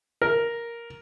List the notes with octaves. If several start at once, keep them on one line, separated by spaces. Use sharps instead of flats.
A#4